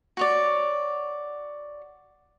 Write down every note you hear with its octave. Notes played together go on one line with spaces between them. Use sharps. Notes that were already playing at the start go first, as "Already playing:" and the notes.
F#4 C#5 D5